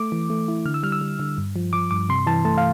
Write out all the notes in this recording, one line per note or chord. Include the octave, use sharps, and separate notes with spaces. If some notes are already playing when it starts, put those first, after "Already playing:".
Already playing: A3 D6
E3
A3
E4
D3 F6
E6
G3 F6
E6
G3
D3
G2
F3
F3 D6
G2 D6
C3 C6
E3 A5
A3 A5
F5